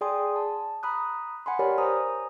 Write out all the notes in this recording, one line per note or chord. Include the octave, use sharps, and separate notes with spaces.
G#4 D5 G5 G#5 C6 D#6
A5
A#5 B5 D#6 F#6
F#5 G#5 B5 C6
G4 A#4 C#5 D5 G#5 B5
C5 G#5 A#5 D#6